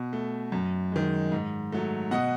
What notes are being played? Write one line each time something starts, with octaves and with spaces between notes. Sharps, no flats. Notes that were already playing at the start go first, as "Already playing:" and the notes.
Already playing: B2
A3
F#2
D#3 G#3
G#2
F#3 A3
B2 D#5 F#5